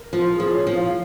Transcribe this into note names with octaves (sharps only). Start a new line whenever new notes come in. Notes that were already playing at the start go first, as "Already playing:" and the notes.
Already playing: A#4
F3 F4
G#4
F3
C#5
F3
F5